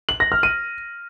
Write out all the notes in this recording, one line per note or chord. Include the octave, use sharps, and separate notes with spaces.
F#7
A#6
F6
D#7